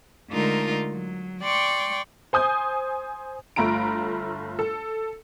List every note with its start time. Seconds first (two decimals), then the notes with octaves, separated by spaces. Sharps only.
0.30 D3 G#3 A3 D#4 F4 A#4
0.91 F#3
1.42 D5 G5 C6 C#6
2.33 C5 G#5 D#6 G6
3.56 G1 A3 F4 A#5 B5 D7
4.59 A4